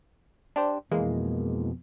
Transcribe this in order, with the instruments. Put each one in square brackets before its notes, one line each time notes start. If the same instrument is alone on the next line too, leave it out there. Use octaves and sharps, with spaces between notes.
[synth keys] D4 G4 C5
[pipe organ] F2 B2 [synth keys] E3 G#3 A#3